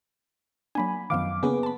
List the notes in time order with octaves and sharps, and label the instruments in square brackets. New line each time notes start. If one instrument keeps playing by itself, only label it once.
[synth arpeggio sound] F#3 A#3 D4 [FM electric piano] G#5 B5
[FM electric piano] F#2 F5 D6 [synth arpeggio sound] D#3 F3 B3
[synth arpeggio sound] C#3 A#3 C#4 [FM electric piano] B3 G#4 B4
[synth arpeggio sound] A5 B5